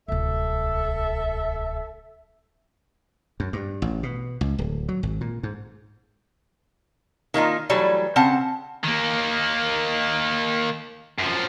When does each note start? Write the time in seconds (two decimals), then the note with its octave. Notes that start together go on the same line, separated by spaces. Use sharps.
0.08 D1 C2 A4 E5
3.40 F#2
3.53 G2
3.82 A1
4.03 B2
4.41 C#2
4.59 D1
4.89 F#3
5.03 G#1
5.21 A#2
5.43 G#2
7.34 D#3 A#3 D#4 F4
7.69 E3 F#3 G3 A3
8.16 C#3 C4 F#5 A5
8.84 D#3 A#3
11.19 F#2 F3